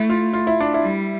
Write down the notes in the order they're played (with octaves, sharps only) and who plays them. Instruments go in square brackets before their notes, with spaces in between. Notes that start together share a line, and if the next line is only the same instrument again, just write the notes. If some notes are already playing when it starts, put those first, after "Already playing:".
Already playing: [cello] A3 [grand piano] E4
[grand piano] F4
F4
E4
D4
E4
[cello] G3